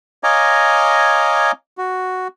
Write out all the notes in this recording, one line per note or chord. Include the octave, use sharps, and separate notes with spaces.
C#5 D#5 F5 G#5 A#5 D6
F#4